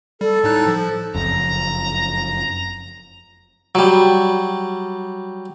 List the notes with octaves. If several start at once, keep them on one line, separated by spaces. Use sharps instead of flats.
G3 A4
A2 D#4 F#6
F3
F#1 F2 A#5
F#3 G3